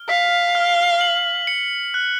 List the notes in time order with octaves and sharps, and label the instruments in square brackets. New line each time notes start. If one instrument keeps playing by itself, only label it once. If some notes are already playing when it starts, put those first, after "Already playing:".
Already playing: [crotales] F6
[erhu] F5 [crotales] B6
[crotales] F6
F#7
C#7
F#6